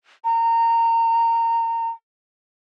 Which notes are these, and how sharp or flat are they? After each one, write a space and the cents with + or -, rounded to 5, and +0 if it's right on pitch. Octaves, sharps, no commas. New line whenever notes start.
A#5 -20